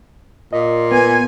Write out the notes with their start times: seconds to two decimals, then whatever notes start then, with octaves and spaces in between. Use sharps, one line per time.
0.53 A#2 D#5
0.92 B3 G#5